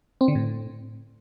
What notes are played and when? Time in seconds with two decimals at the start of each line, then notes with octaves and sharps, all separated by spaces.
0.21 C4
0.28 D3
0.35 A2